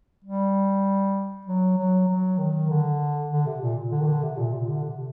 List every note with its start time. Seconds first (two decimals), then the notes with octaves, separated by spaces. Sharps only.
0.25 G3
1.47 F#3
1.77 F#3
2.08 F#3
2.38 D#3
2.70 D3
3.31 D3
3.46 C3
3.62 A#2
3.92 D3
4.01 D#3
4.07 D3
4.23 C3
4.37 A#2
4.53 C3
4.69 D3
4.85 C3